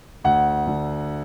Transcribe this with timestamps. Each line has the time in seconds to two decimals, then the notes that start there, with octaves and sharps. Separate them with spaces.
0.24 D2 F#5
0.67 D3